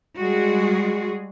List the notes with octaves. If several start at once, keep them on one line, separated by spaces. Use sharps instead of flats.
G3 G#3 F#4 G#4